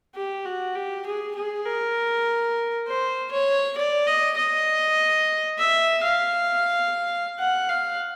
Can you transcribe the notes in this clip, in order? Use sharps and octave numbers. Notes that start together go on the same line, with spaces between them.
G4
F#4
G4
G#4
G#4
A#4
C5
C#5
D5
D#5
D#5
E5
F5
F#5
F5